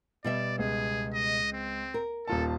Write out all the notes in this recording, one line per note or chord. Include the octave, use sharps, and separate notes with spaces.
B2 G3 D5 E5
C#2 G#4
D#5
C4
A#4
D#1 F4 A4 A5